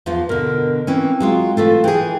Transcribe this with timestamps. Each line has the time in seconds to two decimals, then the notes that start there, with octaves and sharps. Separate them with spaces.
0.06 E2 F3 F4
0.29 B2 D3 A#4
0.87 E3 A#3 C4 C#4
1.20 F#3 G#3 F4
1.57 E3 A3 F4 A4
1.84 E3 G#4 G5